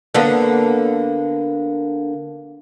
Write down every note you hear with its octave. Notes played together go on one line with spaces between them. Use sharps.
D3 A#3 B3